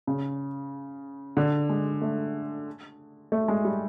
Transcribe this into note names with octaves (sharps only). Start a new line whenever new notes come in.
C#3
D3
G#3
A3
A3
G#3
G3